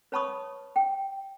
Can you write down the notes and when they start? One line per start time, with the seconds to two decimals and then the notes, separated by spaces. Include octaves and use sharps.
0.12 B4 C#5 A5 B5 C#6 D#6
0.76 G5